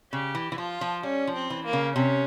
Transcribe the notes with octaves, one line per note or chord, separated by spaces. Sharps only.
C#3 G4
E3
E3
F3 F4
F3
G3 C#4
F3
C4
E3
A#3
C#3
C3 C#4